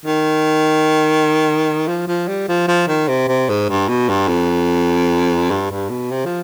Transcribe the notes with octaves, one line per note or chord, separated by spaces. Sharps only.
D#3
F3
F3
G3
F3
F3
D#3
C3
C3
G#2
G2
B2
G2
F2
G2
G2
B2
C3
F3